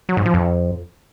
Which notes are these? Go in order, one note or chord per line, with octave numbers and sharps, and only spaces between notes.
F#3
G#2
F3
F2